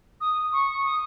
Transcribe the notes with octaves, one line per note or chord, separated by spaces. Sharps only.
D#6
C#6
D#6